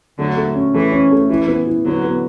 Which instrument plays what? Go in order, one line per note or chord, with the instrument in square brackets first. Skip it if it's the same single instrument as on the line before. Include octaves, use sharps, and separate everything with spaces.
[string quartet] D3 F#3 [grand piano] A3
[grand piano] A3
C#4
[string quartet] E3 [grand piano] A3
[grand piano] C#4
A3
[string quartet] E3 [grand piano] E4
[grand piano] B3
E3
[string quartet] D3 F#3 [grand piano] B3
[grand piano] B3